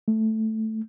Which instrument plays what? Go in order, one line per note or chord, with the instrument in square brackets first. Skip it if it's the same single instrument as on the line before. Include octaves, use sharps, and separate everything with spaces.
[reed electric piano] A3